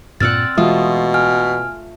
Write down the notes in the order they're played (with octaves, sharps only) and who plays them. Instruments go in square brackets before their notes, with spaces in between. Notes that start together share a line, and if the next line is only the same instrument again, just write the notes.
[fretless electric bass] G2 A#2 [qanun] C4 D5 F#5 [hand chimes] E6 F6 A6
[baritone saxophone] B2 [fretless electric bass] E3 G#3 [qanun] A3 F4 [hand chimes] D#6
[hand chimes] G#5 F6